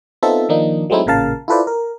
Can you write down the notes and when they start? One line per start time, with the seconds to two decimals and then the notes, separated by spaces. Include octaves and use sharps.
0.22 B3 C4 D#4 F4 A4 E5
0.49 D#3 F3 A#3 D4 D#4
0.90 F#3 G#3 A3 C4 D#4 E4
1.06 A1 A#2 C#3 A#4 F5 A5
1.48 E4 F4 A4 B4 C5 D5
1.67 A#4